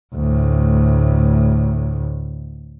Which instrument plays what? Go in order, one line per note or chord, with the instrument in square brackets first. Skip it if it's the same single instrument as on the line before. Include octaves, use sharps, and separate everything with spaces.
[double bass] D2 A2